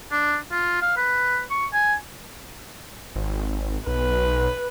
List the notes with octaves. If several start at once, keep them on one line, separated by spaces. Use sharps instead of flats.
D4
F4
F5
B4
C#6
G#5
G#1
B1 B4